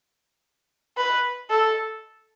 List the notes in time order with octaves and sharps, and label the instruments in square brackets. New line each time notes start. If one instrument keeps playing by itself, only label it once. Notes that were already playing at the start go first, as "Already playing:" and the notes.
[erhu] B4
A4